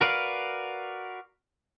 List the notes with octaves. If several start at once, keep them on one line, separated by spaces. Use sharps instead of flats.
F#4 A#4 B4 D5 F5